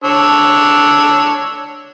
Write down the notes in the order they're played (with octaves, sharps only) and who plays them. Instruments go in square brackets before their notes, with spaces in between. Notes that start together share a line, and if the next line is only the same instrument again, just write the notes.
[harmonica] D4 C#5 E6